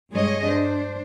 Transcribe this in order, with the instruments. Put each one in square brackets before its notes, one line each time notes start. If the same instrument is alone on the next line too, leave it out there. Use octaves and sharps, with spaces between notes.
[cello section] G2 G3 G#3 G#4 C#5 D#5
D4 C5